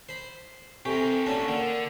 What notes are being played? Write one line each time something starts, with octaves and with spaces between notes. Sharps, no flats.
C5 B5
C3 G4 A4 A#4 G#5 C#6
A#2 A3 C#4 D4 F#4
D3 A#3 D5 F#5